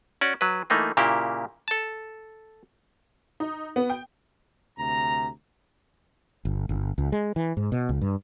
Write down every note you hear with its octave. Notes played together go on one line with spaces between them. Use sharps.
C#4 F#4 D5
F#3 B4
E3 A3 A#3 D#4 F4
A#2 C#3 A#3 E4 G4
A4 A5
D#4
B3
G5
D2 C3 A#5
G1
G1
C#2
G#3
E3
G#2
B2
C#2
G2